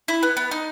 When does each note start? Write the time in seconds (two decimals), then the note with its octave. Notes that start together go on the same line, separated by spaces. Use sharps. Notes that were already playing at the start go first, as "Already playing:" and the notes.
0.08 E4
0.23 B3
0.37 B3
0.51 D#4